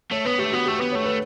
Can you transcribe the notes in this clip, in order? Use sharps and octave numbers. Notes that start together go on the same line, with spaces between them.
A3 C#5
B3 B4
A3 G4
B3 F#4
A3 G4
B3 B4
A3 C#5
B4